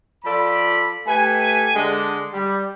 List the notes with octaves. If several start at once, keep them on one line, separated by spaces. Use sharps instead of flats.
F3 F4 A4 D5 B5
A3 G4 B4 G#5
D3 G#3 D4
G3